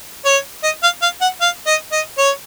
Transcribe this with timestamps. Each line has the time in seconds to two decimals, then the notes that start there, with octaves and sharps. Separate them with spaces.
0.25 C#5
0.63 D#5
0.83 F5
1.02 F5
1.21 F#5
1.41 F5
1.66 D#5
1.92 D#5
2.18 C#5